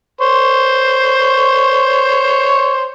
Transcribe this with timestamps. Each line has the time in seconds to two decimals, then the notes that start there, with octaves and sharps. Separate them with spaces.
0.21 C5 C#5